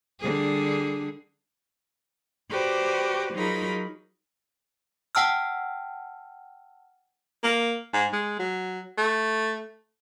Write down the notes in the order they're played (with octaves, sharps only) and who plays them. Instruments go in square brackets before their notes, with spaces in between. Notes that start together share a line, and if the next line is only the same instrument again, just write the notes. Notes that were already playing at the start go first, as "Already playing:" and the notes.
[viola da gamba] D3 G3 G#4
[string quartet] F#4 G4 B4 C5 D5
F#3 D#4 F4 G#4 A#4 B5
[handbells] F#5 G5 A5 E6 F6
[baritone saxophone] A#3
G#2
G#3
F#3
A3